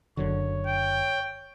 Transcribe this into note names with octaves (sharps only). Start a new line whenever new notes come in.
F#1 F#2 D3 C#5
G5